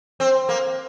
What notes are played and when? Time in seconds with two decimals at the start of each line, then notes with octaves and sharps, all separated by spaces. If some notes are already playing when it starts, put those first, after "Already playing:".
0.20 C4
0.49 A#3